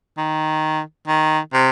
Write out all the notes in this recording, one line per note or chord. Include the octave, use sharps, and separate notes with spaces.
D#3
D#3
C3